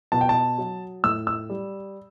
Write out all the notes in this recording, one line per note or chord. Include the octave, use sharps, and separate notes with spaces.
B2 A5
G5
A5
F#3
A2 E6
E6
G3